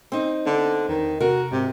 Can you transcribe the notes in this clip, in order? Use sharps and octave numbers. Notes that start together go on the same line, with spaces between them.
C4 D#4
D3 B3
E2 D#3
C3 F#4 A#4
G#2 C3